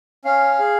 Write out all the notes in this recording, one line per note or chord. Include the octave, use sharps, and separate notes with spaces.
C#4 F5
G#4